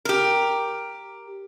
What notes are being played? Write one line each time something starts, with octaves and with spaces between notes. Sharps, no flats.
G4 A#4